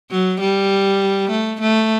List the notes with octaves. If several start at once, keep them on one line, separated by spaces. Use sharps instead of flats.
F#3
G3
A3
A3